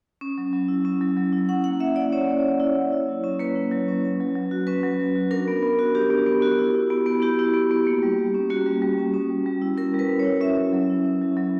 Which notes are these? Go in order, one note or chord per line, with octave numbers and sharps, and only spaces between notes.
C#4
F#3
F#3
E4
C#4
F#3
F#3
E4
C#4 F#5
A#3 F#5
A#3 E5
E4 D5
C#4 C#5
A#3
A#3
E4
A#3
E4
F#3
C#4
A#3 B4
E4
F#3
C#4
C#4
F#3
F#3
F#4
C#4 B4
F#3
F#3
F#4
D4 A#4
B3
B3
F#4
D4 G4
B3
B3
F#4
E4
E4
B3
B3
E4 G4
E4
B3
B3
A#3
G3
G3
C#4
A#3 F#4
G3
G3
C#4
C#4
G3
G3
E4
C#4 A#4
G3
B4
G3
C#5
E4
C#4 E5
F#3
F#3
E4
C#4
F#3
F#3